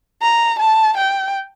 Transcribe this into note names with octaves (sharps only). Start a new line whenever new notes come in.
A#5
A5
G5